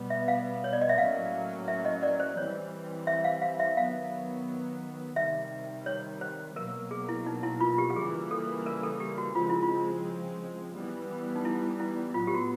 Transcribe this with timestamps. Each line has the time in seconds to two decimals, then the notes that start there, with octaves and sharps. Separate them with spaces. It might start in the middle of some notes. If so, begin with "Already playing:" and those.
Already playing: B2 G3 B3
0.10 E5
0.28 F5
0.64 C#5
0.73 D5
0.81 D#5
0.89 E5
0.98 A2 F#3 A#3 C#4 F5
1.68 E5
1.85 D#5
2.03 D5
2.20 C5
2.37 E3 G3 C4 C#5
3.07 E5
3.24 F5
3.42 F5
3.60 E5
3.77 D#3 F#3 B3 F5
5.16 C3 D#3 G3 E5
5.86 C#5
6.21 C5
6.56 B2 F#3 A#3 A#4
6.91 G#4
7.09 E4
7.26 D#4
7.43 E4
7.60 F4
7.78 G4
7.90 G4
7.96 C#3 E3 G3 A#3 G#4
8.31 A4
8.66 A#4
8.83 A4
9.00 G4
9.18 F#4
9.35 C#3 F3 G#3 C4 F4
9.49 E4
9.63 F4
10.75 E3 G3 B3
11.36 D#4
11.45 E4
11.80 E4
12.14 A2 F#3 B3 F4
12.27 G4
12.35 F#4